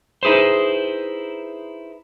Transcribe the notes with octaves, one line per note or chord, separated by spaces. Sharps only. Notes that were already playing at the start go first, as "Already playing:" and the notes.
D#4 E4 G#4 B4 C5